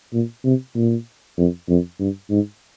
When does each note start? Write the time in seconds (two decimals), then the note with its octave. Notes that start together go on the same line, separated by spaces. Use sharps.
0.13 A#2
0.45 C3
0.76 A#2
1.38 F2
1.69 F2
1.99 G2
2.30 G#2